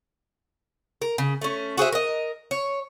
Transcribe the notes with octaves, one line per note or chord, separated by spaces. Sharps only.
A#4
C#3
A3 C#4
F#4 G#4 C5 E5
A#4 D#5
C#5